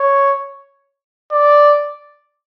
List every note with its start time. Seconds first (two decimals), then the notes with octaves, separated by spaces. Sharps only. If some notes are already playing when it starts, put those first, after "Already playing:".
Already playing: C#5
1.32 D5